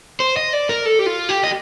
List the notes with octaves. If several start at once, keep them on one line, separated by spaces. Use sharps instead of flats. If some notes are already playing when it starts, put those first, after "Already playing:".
C5
D#5
D5
A#4
A4
G4
F4
G4
D#5